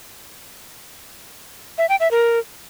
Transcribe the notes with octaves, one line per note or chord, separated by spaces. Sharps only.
E5
G5
E5
A#4